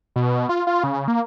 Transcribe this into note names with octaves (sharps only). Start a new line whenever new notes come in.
B2
F4
F4
C#3
A#3